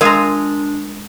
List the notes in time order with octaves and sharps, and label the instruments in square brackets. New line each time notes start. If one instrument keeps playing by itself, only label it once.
[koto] G#3 F4 [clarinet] D4 [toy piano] A#4 [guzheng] G#5 A#5